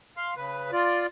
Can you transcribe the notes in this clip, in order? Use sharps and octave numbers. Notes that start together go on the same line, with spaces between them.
F5 C6
C#3 B4
F4 D5